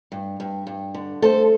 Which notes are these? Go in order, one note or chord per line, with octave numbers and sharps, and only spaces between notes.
G2
G2
G2
D3
A3 A4 C5